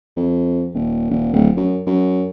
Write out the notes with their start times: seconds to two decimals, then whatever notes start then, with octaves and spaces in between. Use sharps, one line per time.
0.17 F2
0.74 D#1
1.10 D#1
1.33 D1
1.57 F#2
1.87 F#2